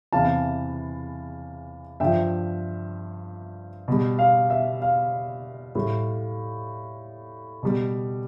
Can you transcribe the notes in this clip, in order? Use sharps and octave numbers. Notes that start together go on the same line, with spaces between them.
E2 C3 E3 F5 A5
G2 F3 E5 G5
B2 G3
F5
E5
F5
A2 G3
B2 G3